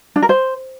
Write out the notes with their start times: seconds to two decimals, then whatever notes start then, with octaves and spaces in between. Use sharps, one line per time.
0.16 D4
0.22 A#4
0.29 C5